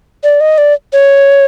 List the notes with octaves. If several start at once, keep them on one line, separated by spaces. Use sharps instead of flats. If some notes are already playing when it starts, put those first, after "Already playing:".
D5
D#5
D5
C#5